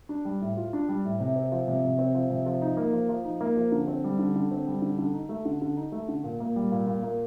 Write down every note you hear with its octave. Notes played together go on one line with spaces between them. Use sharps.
D4
G3
A2
F4
D4
G3
A2
C3
C4
F3
C3
C3
C4
F3
C3
F3
D#4
A#3
F3
F3
D#4
A#3
F3
D3
C4
G3
D3
D3
C4
G3
D3
D3
D#4
A3
D3
D3
D#4
A3
D3
A#2
A#3
G3
A#2
A#2
A#3